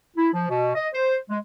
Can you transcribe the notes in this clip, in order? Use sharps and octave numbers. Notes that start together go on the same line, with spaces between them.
E4
F3
B2
D#5
C5
G#3